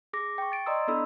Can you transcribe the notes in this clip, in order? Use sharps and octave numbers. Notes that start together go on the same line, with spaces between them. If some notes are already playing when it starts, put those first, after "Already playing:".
G#4 D6 A#6
G5 C#6
A6 D7
D5 D#5 A#5 C6 D#6 E6
B3 D4 E4 A4 B5 E6